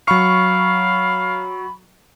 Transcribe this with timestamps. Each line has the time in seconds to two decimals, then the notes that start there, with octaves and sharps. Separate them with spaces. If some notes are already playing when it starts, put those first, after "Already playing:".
0.08 F#3 F5 B5 C#6